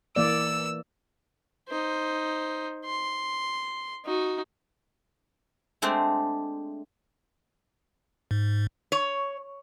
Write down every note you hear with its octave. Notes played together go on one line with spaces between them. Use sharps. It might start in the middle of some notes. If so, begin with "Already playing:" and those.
E3 A#3 D5 E6
D#4 C5
C6
D#4 F#4
G#3 A3 C4 D4 G4 C5
G#2
C#5